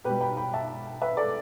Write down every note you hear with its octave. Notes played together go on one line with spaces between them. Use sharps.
B2 G3 G4 B4
G5 B5
G5 B5
E5 A5
B4 E5
A4 D5